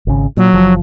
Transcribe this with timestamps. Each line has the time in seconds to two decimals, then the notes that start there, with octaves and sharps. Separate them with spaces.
0.07 G#1 C#3
0.37 A#2 F#3
0.53 F#1 F3